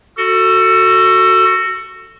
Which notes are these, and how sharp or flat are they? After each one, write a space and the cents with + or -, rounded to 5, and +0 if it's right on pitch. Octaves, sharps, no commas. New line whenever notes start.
F#4 +0 A4 +25